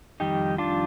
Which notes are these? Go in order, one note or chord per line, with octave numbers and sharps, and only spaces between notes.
F2 D#3 G3 D#4 G4
D4 F4